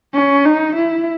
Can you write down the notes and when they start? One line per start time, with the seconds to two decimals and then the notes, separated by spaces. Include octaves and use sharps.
0.14 C#4
0.45 D#4
0.75 E4